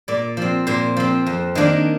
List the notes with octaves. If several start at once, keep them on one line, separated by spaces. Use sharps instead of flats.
A#2 D5
F3 C4
A#2 C5
F3 C4
F2
D#3 A#3 D4